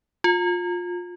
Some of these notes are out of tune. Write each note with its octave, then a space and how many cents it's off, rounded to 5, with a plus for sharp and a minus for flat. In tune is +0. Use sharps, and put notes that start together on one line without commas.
F4 +20